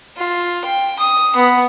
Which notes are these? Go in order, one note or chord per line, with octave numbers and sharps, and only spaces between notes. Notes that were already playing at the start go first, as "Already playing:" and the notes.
F4
G5
D#6
B3